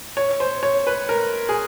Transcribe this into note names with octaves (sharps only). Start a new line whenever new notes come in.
C#5
C5
C#5
B4
A#4
G#4